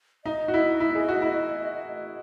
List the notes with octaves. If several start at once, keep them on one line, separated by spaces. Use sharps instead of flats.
D#4 D#5
F#4
E4
E4
G#4
F#4
E4